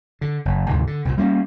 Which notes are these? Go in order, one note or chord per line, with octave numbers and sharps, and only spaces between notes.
D3
F#1
D2 G#2 C3 D#3
D3
C2 A#2
G3 A#3 C#4